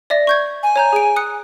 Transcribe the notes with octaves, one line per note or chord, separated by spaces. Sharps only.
D5 E5 A#6
C#6 G6 G#6
G#5
C#5 A#5 G6
G#4 D7
D#6 F#6 C#7